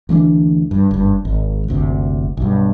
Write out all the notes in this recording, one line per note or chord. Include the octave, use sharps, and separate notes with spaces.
D2 E3 C#4 D4
G2
F#1 G2
G#1
F#1 D2 C3
B1 G2